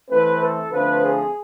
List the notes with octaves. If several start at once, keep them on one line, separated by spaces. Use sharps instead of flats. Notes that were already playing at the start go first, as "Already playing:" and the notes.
E3 A3 C4 B4
A4
D3 F3 A3 C4 B4
G#4